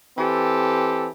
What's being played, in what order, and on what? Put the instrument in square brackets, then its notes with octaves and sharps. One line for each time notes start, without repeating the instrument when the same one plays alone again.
[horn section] E3 C4 G4 A4